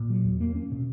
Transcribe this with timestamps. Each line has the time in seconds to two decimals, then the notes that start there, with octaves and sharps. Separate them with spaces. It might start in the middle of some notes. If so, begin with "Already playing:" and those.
Already playing: A#2
0.10 F#3
0.25 E2
0.40 A#3
0.55 C#4
0.71 B2